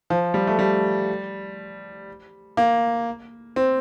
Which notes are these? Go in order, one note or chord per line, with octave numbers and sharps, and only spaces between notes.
F3
G3
A3
G3
A#3
C4